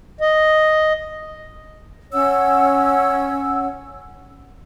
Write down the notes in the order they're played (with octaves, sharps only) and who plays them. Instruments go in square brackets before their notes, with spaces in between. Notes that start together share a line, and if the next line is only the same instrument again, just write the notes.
[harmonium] D#5
[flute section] C#4 C#5 F#5 E6